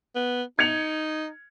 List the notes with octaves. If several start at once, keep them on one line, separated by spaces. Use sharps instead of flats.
B3
D#4 G#6 C#7 F7